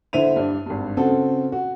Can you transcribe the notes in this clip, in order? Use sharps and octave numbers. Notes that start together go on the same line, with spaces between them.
D3 E4 C5 E5 D#7 F7
G2 D4
G#1 G2
C#3 C4 F#4 A4
F#4